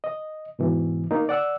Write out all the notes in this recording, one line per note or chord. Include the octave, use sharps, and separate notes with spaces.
D#5
G#2 B2 E3
A#3 D#4
D5 F#5 E6